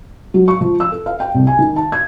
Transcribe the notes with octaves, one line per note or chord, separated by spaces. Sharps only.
F#3
C#6
F3
E6
A4
F5
G5
C2
G#5
D#3
A5
G#6